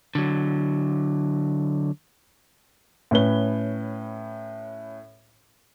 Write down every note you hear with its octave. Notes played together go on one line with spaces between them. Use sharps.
D3 F#3
A2 C#4 B4 G7